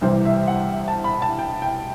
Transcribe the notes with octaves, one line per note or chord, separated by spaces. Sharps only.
C2 C3 E3 G3 C5
E5
F#5
A5
B5
A5
G5
G5